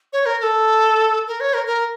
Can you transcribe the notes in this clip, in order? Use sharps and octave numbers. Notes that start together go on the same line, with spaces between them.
C#5
A#4
A#4
A4
A#4
C#5
A#4
A#4